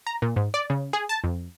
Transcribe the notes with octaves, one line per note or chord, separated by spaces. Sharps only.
A#5
A#2
G#2
D5
C#3
G#4
A5
F2